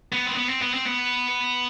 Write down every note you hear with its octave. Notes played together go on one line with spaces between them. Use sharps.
B3
C4
B3
C4
B3
C4
B3